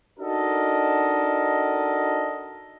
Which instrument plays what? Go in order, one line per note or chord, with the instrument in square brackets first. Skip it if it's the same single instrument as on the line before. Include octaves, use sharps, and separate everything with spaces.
[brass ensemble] D4 D#4 F#4 A4 A#4 D#5